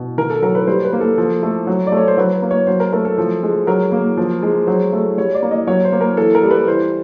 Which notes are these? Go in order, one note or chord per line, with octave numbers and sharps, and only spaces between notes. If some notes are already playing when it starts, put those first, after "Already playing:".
Already playing: B2
D#3 A#4
A4
F#3 A#4
B4
G3 C5
B4
A#3
A4
F3
A3
F#3
D5
A3 C#5
C5
F#3 B4
B4
A#3
C#5
F#3 C5
A#4
A3 A#4
A4
F3
G#3
F#3 A#4
A#3
F3
G#3
F#3 C5
A3
G3 C#5
D5
A#3
D#5
F#3 C#5
C5
A#3
A#4
E3 A4
A#4
G3
B4
E3 C5